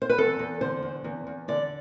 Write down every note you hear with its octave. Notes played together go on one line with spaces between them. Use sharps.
C5
B4
E2 A4
E2
D3 C5
E2
E2
E2
D3 D5